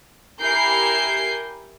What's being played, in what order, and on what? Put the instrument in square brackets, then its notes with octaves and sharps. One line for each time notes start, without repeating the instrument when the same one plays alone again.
[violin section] E4 G4 A#4 G#5 G6 C7